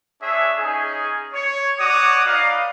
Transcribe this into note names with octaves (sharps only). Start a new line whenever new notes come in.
D4 G#4 C#5 E5
C#4 D#4 G#4
C#5
F#4 C#5 D5 D6 D#6
D#4 B4 D5 F5